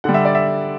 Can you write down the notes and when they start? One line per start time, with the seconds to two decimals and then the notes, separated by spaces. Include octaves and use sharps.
0.04 D3 G3 F#5
0.14 E5
0.25 D5
0.35 E5